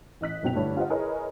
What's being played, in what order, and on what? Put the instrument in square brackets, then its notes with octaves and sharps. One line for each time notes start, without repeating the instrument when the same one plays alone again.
[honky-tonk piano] A1 D#5 F#6 B6
F#1 B2 F#3 C4 G5 F7
G2 D3 A3 E4 C#5
F4 G4 C5 D#5 F#5
E4 G#4 A#4 B4 C#5 D#5